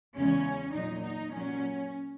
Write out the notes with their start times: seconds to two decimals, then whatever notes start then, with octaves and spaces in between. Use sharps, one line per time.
0.17 E2 C#3 E3 G#3 C#4
0.76 A#2 F#3 D#4
1.05 D#4
1.34 A#2 F#3 C#4